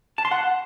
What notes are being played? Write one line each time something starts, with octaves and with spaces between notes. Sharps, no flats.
A5
C6
F#5